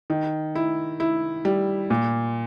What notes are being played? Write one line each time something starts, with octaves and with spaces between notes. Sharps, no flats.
D#3
E4
E4
G3
A#2